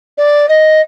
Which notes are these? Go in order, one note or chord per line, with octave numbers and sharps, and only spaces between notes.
D5
D#5